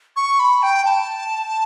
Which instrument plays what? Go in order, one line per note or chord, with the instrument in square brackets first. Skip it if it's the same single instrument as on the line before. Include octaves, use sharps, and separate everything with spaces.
[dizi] C#6
B5
G5
A5